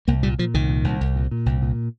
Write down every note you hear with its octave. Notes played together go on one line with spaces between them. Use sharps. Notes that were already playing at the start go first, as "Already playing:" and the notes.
C2 A#3
A#2 G3
A#2 F3
C2 D#3
A#2
C2
C2
A#2
A#2
C2
A#2